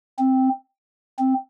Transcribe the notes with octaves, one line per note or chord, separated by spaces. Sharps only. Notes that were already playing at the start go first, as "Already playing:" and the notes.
C4
C4